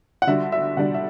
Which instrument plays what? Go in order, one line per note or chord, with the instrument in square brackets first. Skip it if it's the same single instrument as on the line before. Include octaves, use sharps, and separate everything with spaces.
[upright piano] F#5
[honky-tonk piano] D3 G3 D4 F#4 [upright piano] E5
[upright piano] E5
[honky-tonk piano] D3 G3 D4 F#4 [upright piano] F#5
[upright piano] E5